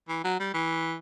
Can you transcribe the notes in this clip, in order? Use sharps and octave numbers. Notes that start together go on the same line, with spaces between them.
E3
F#3
G3
E3